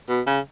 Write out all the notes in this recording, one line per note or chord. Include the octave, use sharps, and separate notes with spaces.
B2
C#3